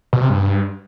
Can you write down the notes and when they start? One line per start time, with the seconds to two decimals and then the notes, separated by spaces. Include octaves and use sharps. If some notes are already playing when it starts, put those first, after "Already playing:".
0.13 B2
0.21 C3
0.30 G2